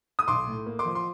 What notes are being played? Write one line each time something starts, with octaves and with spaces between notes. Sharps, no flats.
D#6
B1 C6 D6
A2
A#3
C6 D6
F3
C6